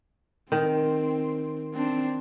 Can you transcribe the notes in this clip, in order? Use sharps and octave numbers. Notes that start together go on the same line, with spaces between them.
D#3 C4
C4 D4